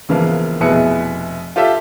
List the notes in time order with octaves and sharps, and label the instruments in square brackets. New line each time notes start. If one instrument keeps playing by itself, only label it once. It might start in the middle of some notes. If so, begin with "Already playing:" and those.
[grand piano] E1 C#3 E3 F3 A#3 F5
F1 B2 B3 E4 G#4 C#7
F4 G4 A4 E5